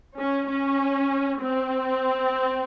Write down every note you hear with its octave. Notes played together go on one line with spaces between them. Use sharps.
C#4
C#4
C4